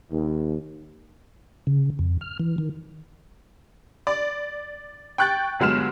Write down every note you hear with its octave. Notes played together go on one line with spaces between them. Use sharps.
D#2
C#3
F2
F6
E3
D#3
D5
G5 C#6 F#6 G6 A6
G1 F#3 G#3 B3 F6 E7